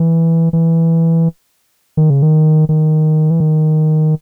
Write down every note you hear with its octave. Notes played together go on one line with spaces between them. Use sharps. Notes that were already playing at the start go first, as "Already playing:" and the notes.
Already playing: E3
E3
D#3
C#3
D#3
D#3
E3
D#3